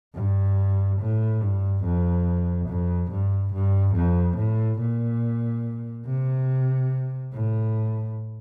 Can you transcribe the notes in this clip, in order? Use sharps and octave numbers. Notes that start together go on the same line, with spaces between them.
G2
A2
G2
F2
F2
G2
G2
F2
A2
A#2
C3
A2